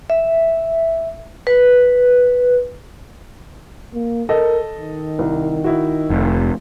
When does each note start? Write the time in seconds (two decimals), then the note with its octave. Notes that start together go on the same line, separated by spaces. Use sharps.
0.10 E5
1.47 B4
3.94 A#3
4.29 A4 A#4 D#5
4.78 D#3
5.19 C2
5.64 D#4 E4 F#4
6.10 F1